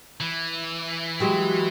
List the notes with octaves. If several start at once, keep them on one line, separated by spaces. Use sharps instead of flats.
E3
F#3 G#3 G4